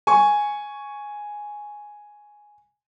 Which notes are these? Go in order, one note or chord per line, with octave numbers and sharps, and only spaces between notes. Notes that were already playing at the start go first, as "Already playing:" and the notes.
G#5 C#6